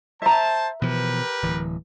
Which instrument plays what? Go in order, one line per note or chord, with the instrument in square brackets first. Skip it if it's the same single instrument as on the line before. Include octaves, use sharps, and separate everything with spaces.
[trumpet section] C5 A5 [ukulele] E5 A#5
[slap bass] B2 E3 F3 [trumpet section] G4 A#4 B4
[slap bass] D1 E3